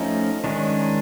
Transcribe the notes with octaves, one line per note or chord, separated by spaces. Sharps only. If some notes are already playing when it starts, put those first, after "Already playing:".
Already playing: F3 A3 C#4 D#4
D#3 G#3 C#4 D4